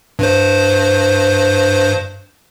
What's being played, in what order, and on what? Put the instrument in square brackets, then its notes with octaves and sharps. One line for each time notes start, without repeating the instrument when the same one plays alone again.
[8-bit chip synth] G2 C5